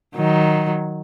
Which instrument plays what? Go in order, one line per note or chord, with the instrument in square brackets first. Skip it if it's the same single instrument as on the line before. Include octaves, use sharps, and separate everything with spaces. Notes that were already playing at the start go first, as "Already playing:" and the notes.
[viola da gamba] D#3 F#3